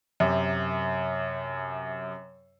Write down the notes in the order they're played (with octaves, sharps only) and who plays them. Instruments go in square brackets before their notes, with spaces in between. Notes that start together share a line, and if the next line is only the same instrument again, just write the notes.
[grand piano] F#2 C3